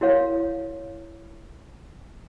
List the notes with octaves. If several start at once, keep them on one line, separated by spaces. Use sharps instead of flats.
E4 F#4 A#4 C#5 F5